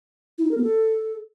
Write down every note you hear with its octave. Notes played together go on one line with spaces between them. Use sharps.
E4
D#4
A#4
B3
A4